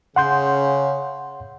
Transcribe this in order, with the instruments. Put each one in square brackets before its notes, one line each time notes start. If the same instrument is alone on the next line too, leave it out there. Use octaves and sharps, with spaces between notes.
[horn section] C#3 [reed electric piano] F#5 C6 G6